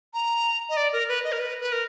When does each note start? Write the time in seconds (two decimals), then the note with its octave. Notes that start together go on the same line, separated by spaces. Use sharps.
0.14 A#5
0.70 D#5
0.77 D5
0.93 A#4
1.08 B4
1.24 D#5
1.32 A#4
1.39 B4
1.61 B4
1.72 A#4